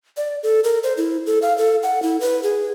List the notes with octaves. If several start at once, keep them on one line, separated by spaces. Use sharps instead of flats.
D5
A4
A#4
C5
E4
A4
F5
A4
F#5
E4
B4
G#4